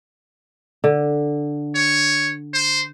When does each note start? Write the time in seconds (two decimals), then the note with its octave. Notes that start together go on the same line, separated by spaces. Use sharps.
0.84 D3
1.76 C#5
2.54 C5